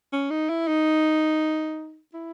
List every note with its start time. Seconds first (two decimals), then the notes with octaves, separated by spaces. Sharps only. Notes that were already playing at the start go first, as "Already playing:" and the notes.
0.13 C#4
0.30 D#4
0.49 E4
0.67 D#4
2.13 E4